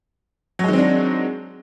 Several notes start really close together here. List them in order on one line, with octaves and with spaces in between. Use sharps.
F#3 G#3 D#3 C4 D4